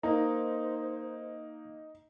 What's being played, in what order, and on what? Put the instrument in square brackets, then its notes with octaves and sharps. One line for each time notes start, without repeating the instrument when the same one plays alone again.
[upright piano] A#3 [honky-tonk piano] D#4 [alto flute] C5 [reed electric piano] A#5